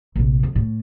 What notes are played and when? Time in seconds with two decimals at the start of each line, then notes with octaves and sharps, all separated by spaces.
0.16 A#1 C3
0.43 F2
0.56 A2